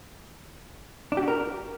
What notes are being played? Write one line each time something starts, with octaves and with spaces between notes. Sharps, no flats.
D4
G4
F#4
A#4